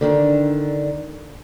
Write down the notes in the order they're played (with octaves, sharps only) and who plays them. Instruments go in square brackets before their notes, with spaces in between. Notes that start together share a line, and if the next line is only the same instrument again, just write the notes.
[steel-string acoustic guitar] D3 D#3 D4